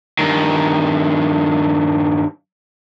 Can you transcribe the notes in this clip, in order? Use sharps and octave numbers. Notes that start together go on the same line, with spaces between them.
G2 D#3